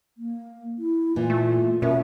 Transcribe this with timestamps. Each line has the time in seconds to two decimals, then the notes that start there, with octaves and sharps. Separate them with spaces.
0.18 A#3
0.79 E4
1.16 A#2 E3 F4
1.30 A3
1.82 B2 A#3 C#4 E5